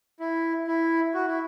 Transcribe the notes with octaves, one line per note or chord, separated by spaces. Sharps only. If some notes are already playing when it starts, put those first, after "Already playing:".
E4
E4
F#4
E4